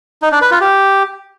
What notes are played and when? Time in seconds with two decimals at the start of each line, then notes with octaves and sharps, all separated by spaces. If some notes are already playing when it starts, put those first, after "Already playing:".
0.22 D#4
0.32 D4
0.42 B4
0.51 F4
0.61 G4